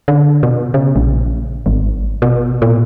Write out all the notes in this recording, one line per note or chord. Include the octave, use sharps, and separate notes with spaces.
D3
B2
C#3
A#1
G#1
B2
A#2